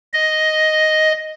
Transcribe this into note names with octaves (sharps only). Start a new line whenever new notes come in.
D#5